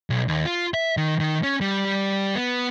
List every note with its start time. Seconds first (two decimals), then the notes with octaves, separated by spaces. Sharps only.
0.10 B1
0.28 D#2
0.46 F4
0.74 E5
0.97 D#3
1.20 D#3
1.43 C#4
1.61 G3
2.36 B3